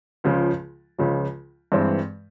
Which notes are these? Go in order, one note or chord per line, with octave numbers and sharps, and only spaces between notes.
C#2 C#3 F3
C#2 C#3 F3
G2 E3 G#3 C4